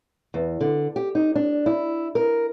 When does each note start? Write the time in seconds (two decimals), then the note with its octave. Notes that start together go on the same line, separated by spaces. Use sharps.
0.34 E2
0.61 D3
0.96 G4
1.15 D#4
1.35 D4
1.66 E4
2.15 A#4